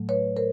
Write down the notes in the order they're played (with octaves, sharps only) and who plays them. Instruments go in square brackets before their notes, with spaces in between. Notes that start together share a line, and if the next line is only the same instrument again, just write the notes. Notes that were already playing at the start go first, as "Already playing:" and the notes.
Already playing: [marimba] A2 F#3 A3
B4 C#5
A#4 C5